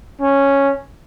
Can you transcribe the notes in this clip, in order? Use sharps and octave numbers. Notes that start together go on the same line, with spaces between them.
C#4